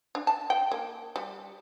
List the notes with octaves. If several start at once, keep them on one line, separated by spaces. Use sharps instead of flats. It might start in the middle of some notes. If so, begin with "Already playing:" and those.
D4
A5
G5
A#3
G3